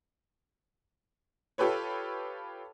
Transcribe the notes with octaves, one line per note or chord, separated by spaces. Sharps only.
F4 G4 A4 B4 C#5